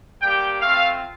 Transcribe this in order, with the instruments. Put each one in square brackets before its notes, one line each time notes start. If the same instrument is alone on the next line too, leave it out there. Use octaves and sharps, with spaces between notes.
[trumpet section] G3 A#3 D4 G4 G5
A3 C4 F4 F5